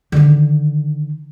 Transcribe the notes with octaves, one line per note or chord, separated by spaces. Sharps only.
D3 D#3